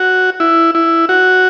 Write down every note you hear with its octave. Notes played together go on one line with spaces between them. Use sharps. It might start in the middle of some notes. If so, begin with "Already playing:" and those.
Already playing: F#4
E4
E4
F#4